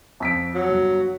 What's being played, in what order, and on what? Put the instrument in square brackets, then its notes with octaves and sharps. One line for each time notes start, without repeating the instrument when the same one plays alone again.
[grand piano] F2 B6 D7
[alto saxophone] F#3
[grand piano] G1